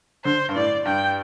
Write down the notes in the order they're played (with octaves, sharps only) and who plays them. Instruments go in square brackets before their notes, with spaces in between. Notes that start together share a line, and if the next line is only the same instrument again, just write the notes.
[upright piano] D3 [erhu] C5
[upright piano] G2
[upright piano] A2 [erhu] D5
[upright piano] G2 [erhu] G5